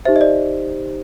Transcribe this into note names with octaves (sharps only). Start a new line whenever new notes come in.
D#4 G4 C5 E5
D#5
D5